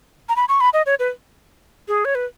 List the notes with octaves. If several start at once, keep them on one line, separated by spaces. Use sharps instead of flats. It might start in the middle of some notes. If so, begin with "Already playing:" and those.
A#5
B5
C#6
B5
D#5
C#5
B4
G#4
C#5
B4